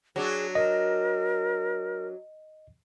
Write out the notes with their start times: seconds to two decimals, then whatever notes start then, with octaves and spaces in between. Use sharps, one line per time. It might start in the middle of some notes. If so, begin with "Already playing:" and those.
0.16 F#3 D4 G#4
0.55 A#4 D#5